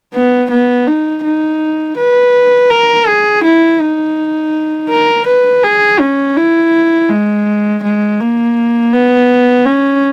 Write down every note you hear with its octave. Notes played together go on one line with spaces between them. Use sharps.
B3
B3
D#4
D#4
B4
A#4
G#4
E4
D#4
A#4
B4
G#4
C#4
E4
G#3
G#3
A#3
B3
C#4